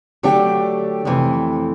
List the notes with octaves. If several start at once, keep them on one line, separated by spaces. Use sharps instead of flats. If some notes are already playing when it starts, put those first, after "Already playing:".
D3 F#3 A3 D4 G4
F2 C3 E3 A3